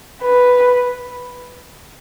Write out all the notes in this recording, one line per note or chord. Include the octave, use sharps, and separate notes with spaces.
B4